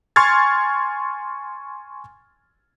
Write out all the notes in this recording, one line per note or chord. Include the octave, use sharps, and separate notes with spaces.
G#5 C6 C#6 F6 G#6 A6